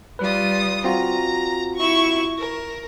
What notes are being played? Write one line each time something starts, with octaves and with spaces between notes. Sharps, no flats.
G3 F4 B4 D#6
C4 F4 F#4 A#5
E4 C#6
A#4